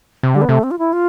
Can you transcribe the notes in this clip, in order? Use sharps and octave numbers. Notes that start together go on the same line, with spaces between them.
C3
D3 G3
B3
C3 A3
C4
F4
E4
F4